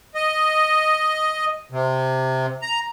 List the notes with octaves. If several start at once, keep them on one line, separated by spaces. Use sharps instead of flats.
D#5
C3
A#5